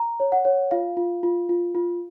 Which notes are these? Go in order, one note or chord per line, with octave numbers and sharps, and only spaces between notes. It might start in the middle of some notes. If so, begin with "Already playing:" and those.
Already playing: A#5
C#5
F#5
C#5
F4 F5
F4
F4
F4
F4